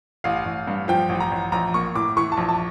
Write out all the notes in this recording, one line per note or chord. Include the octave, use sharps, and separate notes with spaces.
A1 F5
A1
G2
F3 G5
A1
A#5
A1
A#1 A#5
A#3 C#6
A2 D6
E3 C#6
A5
A#1
A5